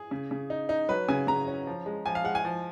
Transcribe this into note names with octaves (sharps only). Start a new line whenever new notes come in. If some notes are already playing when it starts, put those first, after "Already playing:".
Already playing: G#4
C#3
C#3
D#4
D#4
F#3 B4
C#3 G#5
C#3 A#5
C#4
F3
G#3
F3 G#5
F5
G#3 F#5
G#5
F3